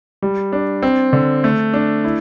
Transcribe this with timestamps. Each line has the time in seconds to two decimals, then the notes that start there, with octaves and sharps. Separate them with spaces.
0.22 G3
0.53 D4
0.83 C4
1.13 D3
1.44 A3
1.74 D4
2.05 E4